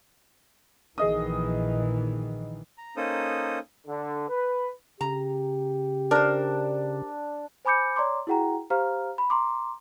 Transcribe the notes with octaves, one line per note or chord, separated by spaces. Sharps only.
A#1 D#3 E3 G#4 D#5 D#6
A#5
A#3 C#4 D#4 A4 C5 D#6
D3
B4
C#3 G4 A#5
D4 A#4 C5
C5 G#5 B5 D6 G6 C#7
C#5 D5 A#5 C6 D6
E4 F#4 G#4 F#5 G5 A#5
G4 C5 F5 A#5 F6
B5
A#5 C6 D6